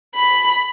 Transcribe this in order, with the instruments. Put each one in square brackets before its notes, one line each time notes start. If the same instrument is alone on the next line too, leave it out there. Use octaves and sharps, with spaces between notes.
[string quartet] B5